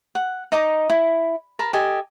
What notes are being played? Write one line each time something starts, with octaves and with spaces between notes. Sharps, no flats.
F#5
D#4 D#5 A#5 D6
E4
A#4 A5 B5
G4 A4 D#5 G#5